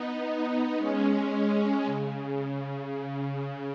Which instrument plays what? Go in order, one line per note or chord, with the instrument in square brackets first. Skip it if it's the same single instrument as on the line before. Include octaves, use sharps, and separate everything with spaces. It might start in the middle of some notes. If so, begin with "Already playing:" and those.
Already playing: [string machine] B3 D#4
G#3 C#4
C#3
C#3